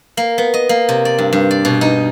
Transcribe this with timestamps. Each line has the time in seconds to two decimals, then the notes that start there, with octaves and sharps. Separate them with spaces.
0.17 A#3
0.38 B3
0.54 D#5
0.69 A#3
0.89 C3
1.05 D5
1.18 G2
1.33 G2
1.51 D5
1.65 B2
1.81 D#4